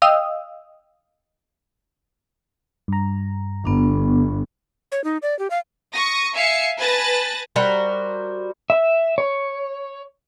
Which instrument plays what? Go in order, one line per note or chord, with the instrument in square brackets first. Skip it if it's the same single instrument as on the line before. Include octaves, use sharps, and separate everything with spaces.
[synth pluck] D#5 F5 G5 D#6 E6
[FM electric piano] G2 A#5
[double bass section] G1 [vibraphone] B3 D4
[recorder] C#5
D#4
D5
G4
F5
[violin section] C#6 D#6 A#6
E5 F5 G#5 C7 C#7
B4 G#5 A5 F#6 A6 A#6
[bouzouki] G3 F#4 A#4 C5
[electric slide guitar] E5
C#5